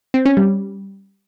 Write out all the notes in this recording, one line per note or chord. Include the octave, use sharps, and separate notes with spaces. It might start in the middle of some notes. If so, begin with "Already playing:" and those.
C4
C#4
G3